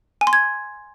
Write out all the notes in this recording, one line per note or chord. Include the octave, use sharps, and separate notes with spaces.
G#5
C6
G#6